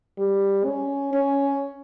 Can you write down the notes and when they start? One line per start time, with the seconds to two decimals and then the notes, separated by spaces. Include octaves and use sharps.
0.18 G3
0.65 C#4
1.13 C#4